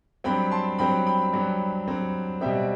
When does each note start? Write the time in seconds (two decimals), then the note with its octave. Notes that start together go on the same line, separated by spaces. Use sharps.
0.24 G2 F#3 C4 G5 B5
0.51 A5 C6
0.78 G2 F#3 C4 G5 B5
1.06 G5 B5
1.33 G2 F#3 C4
1.88 G2 F#3 C4
2.41 B2 G3 C4 E5 G5